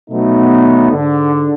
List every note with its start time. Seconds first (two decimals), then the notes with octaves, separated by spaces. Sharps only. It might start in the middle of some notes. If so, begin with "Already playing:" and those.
0.10 B2 F#3 A3 B3 D#4
0.91 G#2 D3